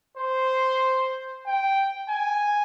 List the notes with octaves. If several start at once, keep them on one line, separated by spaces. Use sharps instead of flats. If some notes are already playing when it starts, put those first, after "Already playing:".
C5
G5
G#5